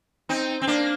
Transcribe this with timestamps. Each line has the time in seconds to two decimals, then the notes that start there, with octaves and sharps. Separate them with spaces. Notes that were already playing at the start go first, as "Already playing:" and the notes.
0.29 C4 D#4
0.62 C4
0.67 A#3 D4